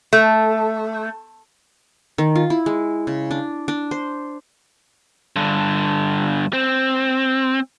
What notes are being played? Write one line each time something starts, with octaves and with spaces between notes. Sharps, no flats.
A3
D#3
F4
E4
G#3
C#3
D4
D4
C5
G2 D3
C4